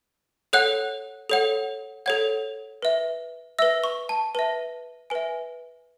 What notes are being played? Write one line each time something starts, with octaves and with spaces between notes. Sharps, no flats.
A4 C#5 F#5 F#6
A4 C#5 F#5
A4 C#5 F#5 G#6
B4 E5
B4 E5 E6
C#6
A5
B4 E5 A5
B4 E5 G#5